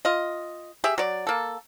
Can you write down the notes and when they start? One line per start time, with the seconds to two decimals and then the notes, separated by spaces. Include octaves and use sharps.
0.05 F4 D#5
0.84 G4 G#4 E5
0.98 F#3 D5
1.27 A#3 A4